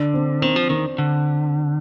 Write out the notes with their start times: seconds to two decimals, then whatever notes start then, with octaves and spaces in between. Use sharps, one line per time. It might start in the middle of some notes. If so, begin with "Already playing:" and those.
Already playing: D3 D4
0.14 C4
0.42 D#3 C4
0.56 F3
0.70 D#3 C4
0.98 D3